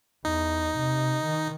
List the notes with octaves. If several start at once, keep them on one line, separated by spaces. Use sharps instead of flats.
E2 D#4
C3
D#3